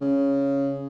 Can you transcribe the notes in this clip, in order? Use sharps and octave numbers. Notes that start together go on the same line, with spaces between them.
C#3